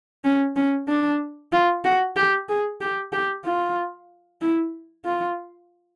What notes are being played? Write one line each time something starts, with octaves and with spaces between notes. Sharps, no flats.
C#4
C#4
D4
F4
F#4
G4
G#4
G4
G4
F4
E4
F4